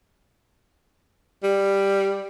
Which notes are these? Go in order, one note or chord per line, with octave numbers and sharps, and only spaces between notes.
G3